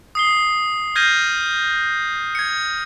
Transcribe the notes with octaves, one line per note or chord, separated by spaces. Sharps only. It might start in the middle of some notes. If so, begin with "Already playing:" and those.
D#6 C7 G7
F6 G6 G#6 A#6 C7 D#7
G#6 C#7